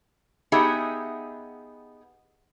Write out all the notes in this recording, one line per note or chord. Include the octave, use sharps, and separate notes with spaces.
B3 D#4 G4 G#4 E5 F#5